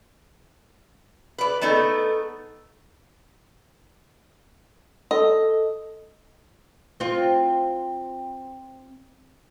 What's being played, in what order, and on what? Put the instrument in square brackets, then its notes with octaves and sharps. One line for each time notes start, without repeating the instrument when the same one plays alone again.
[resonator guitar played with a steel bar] B4 D5
A3 B3 D#4 A4
[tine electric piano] A4 [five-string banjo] D#5
[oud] C4 F4